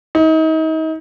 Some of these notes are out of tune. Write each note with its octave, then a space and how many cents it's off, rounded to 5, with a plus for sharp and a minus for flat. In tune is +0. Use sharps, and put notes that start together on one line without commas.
D#4 +35